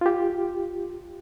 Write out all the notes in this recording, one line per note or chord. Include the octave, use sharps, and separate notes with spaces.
F4 G4